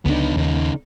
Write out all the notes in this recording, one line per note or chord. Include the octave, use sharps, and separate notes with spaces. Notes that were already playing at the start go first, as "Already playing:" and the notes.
C#2 D3 B3 D4 D#4
D#2 C#3 D#4